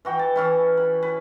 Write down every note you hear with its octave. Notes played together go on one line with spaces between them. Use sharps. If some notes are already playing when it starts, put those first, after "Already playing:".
E3 F#4 G5
A5
E3 C#4 E4
B5
B4